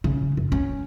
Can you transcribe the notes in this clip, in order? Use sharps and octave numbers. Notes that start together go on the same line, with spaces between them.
C#3
F#2
C#4